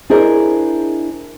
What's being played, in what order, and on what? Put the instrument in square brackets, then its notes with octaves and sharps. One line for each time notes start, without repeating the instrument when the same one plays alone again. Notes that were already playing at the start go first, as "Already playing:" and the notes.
[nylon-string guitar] D4 E4 G#4 A#4 C5 D#5